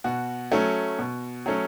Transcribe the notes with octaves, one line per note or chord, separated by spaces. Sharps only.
B2 F#4
F#3 A3 C#4
B2
F#3 A3 C#4